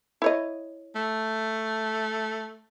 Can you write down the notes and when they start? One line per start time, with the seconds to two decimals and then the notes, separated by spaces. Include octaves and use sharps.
0.22 E4 C#5 D#5
0.95 A3